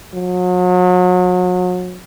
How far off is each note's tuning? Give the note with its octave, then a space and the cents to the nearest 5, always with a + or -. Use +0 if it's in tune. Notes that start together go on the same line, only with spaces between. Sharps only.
F#3 -35